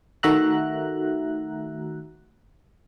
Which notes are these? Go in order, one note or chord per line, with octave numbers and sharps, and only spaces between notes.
D#3 A3 F#4 E5 A#5 F#6